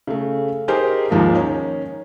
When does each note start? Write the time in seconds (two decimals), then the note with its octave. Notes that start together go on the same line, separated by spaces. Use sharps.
0.07 C#3 A3
0.68 D#4 G4 G#4 A#4 C5
1.10 D#2 G#2 F3 G#3 A#3
1.35 D#3 C#4